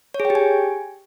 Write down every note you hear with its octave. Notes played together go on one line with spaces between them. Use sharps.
C#5
G#4
G5
G4
G#5